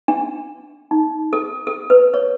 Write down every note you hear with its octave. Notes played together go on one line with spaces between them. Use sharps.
D4
D#4
A4
A4
B4
C#5